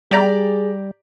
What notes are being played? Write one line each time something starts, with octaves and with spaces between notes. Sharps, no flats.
G3 G4 G#4 D5 A#5